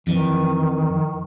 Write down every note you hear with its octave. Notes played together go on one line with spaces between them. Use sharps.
F2 D#3 E3